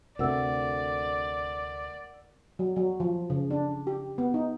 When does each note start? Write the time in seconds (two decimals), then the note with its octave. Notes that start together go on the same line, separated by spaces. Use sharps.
0.19 D2 C3 A3 A#4 D5 F#5 E6
2.59 F#3
2.76 F#3
3.00 F3
3.30 C#3
3.51 D4
3.87 G4
4.18 B3
4.34 D#4